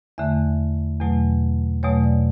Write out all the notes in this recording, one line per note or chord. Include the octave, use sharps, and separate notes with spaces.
E2 D3 A3 E5
E2 B2 F#3 A3
E2 B2 F#3 A3 C#5
D5